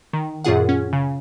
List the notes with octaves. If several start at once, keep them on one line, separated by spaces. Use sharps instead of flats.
D#3
F#2 A#2 F4 G#4 F#5
C#4
C#3